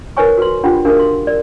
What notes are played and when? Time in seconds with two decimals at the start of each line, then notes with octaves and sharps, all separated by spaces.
0.17 D#4 A#4 B4 C#5 G#5 C#6
0.37 F#4 B4 C6
0.63 D4 F4 G4 F#5 G5 B5
0.85 D4 F#4 G4 A#4 F5
0.99 C6
1.27 A#4 D5